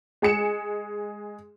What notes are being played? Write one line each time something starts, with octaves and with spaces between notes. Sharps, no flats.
G#3 G#4 C#7 E7